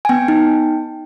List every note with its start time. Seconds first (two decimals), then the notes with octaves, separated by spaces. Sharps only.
0.05 G#5
0.09 B3 G5
0.28 D#4